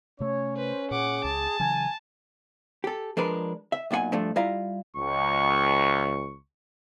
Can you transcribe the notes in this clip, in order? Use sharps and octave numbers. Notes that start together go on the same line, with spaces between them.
C3 A3 C#4 C#5
B4 C5
A#2 G#4 F#5 D6
C#2 A5
C#3 E3 F#3 G#5
G4 A4
F3 G#3 D4 A#4 B4
E5
B1 A#2 F4 F#5 G#5
G2 F3 A3 D4
G3 E4 F4 E5 F5 A#5
C#2 C#6